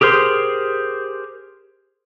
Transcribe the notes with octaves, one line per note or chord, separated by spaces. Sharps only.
G4 G#4 A#4 C5 C6